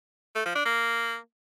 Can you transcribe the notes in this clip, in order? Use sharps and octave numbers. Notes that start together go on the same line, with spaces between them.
A3
F3
D4
A#3